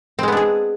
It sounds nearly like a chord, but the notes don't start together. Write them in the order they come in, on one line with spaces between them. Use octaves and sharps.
C4 G#3 B3 D4 G#4